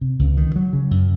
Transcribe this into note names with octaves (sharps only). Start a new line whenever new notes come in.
C3
C#2
D#3
F#3
C#3
F#2